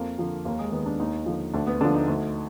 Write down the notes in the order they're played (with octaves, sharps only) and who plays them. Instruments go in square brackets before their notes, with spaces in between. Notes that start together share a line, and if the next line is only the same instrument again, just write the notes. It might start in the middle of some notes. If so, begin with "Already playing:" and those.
Already playing: [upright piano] F2 A#3
D3 F3
D#2 A#3
G#3
D#3 B3
D4
D#2 D#4
D3 F3
D2 D4
B3
D3 F3 D4
D#4
D2